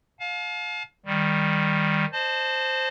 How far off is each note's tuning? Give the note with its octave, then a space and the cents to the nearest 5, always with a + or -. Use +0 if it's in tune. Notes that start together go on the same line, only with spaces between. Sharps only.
F5 +25 A5 -40
D#3 +5 G3 +10
C5 +0 D#5 -30 A5 +0